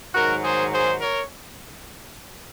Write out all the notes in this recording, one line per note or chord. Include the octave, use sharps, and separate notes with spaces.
G#2 D#3 F#3 F#4 A#4
G#4 C5
G#4 C5
A#4 C#5